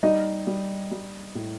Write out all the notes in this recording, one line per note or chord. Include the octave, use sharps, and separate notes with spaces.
G3 D#4 D#5
G3
G3
A2